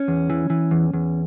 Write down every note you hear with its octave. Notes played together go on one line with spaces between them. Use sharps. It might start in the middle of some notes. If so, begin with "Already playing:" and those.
Already playing: C#4
E2
E3
E3
E2
E2